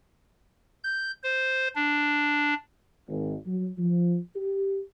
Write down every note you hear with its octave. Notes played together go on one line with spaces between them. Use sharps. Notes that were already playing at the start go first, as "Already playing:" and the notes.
G6
C5
D4
G#1
F#3
F3
G4